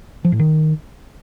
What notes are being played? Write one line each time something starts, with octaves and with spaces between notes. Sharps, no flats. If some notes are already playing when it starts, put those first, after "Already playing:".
F3
A2
D#3